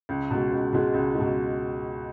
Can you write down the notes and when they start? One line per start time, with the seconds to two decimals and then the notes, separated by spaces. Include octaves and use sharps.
0.09 C#2
0.31 B2 G#3
0.52 C#2
0.73 B2 G#3
0.94 C#2
1.15 G#3
1.20 B2